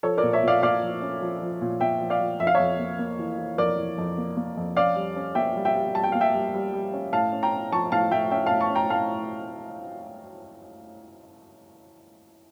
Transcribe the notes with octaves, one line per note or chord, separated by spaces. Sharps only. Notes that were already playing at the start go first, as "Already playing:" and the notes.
F3 A4 C#5
A#4 D5
A#2
C#5 E5
A#2 D5 F5
A#2 D5 F5
F3
C#4
F3
F3
A#2
A#2 E5 G5
F3
D5 F5
F3
F2 E5
F5
C#5 E5
F2
A#3
A#3
E3
E3
F2 A#4 D5
E3
F2
A#3
A#3
F2
C#4 D5 F5
G3
C#4
A#3 E5 G5
G3
E5 G5
G3
G3 A5
G5
A#3 F5
E5 G5
G3
G3
G3
C#4
A2 F5 A5
C#4
G5 A#5
C#4
F3 A5 C#6
A2 F5 A5
A2 E5 G5
C#4 E5 G5
A2 F5 A5
A5 C#6
C#4
G5 A#5
A2 F5 A5